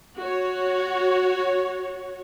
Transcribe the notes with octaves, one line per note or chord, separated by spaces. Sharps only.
F#4 C#5